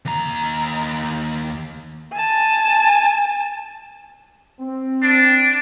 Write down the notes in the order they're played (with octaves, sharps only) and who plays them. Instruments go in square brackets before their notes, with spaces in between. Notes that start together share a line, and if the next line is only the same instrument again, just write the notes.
[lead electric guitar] D#2 A#5
[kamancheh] G#5 A5
[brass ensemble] C4
[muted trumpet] D4